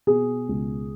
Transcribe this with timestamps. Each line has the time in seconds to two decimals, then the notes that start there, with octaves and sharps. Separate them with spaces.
0.07 B2 G#4
0.49 C#2